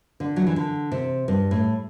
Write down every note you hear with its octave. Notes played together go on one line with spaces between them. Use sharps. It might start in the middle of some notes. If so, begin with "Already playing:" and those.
D3
F#3
E3
D3
C3
G2
A2